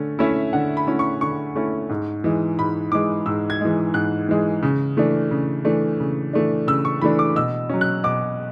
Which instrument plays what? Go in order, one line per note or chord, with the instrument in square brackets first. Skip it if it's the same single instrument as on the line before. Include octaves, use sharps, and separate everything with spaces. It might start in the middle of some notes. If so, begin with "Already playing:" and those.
Already playing: [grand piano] D3 A3 C#4
A3 C#4 E4 E5
D3 F#5
B5
A3 C#4 E4
C#6
D3 C#6
A3 C#4 E4
G#2
E3 G#3
G#2 B5
E3 G#3 D6
G#2 E6
G#6
E3 G#3
G#2 F#6
E3 G#3
C#3
E3 A3 D4
C#3
E3 A3 D4
C#3
E3 A3 D4
C#3 E6
C#6
E3 A3 D4 B5
D6
B2 E6
F#3 C#4
F#6
B2 D6